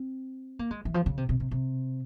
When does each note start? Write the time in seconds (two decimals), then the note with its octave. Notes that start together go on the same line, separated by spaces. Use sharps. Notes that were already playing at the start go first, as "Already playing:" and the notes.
Already playing: C4
0.59 A#3
0.71 G#3
0.85 E3
0.94 F3
1.06 C#3
1.17 C3
1.29 C3
1.40 C3
1.51 C3